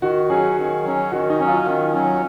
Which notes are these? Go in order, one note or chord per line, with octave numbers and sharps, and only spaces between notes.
D#3 F#4
F#3 C#4 G#4
D#3
F#3 C#4
D#3 F#4
D#4
F#3 C#4
F4
D#3
F#3 C#4